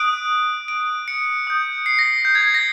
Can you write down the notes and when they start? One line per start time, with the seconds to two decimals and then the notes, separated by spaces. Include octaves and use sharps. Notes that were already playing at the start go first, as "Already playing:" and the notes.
Already playing: D#6 F#6 D7
0.68 D7
1.08 C#7
1.47 D#6 G6
1.86 C7
1.99 A#6
2.25 G6
2.35 G#6
2.55 A#6